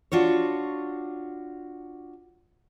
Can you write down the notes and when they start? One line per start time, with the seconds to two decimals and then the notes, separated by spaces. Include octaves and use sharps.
0.12 D4 F4 F#4 C#5